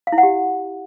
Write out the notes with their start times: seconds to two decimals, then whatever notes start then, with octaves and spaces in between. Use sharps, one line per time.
0.07 F5
0.12 E4
0.18 F#5
0.23 G4